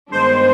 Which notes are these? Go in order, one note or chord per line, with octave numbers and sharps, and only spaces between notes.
G2 D#3 G#3 B3 D4 C5